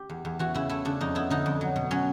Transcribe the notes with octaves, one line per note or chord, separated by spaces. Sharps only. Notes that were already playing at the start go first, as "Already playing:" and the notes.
Already playing: G4
E2
E2
E3 F#4
C#3 E4
A3 E4
C#3 D4
F2 D#4
B3 E4
D3 D#4
F2
F#3
B2
F#3 C#4